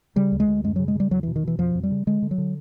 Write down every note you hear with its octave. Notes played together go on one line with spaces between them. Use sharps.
C#3 G3
D2
G#3
D2
F#2 G#3
C#3 F#3
G#3
C#3 G3
E2 F#3
B2 E3
D#3
B2 E3
F2 F3
F2
G3
C#3
D3 G#3
D3
F#3
D3